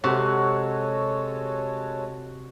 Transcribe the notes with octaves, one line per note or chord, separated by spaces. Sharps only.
C3 G#3 F#4 A4 C#5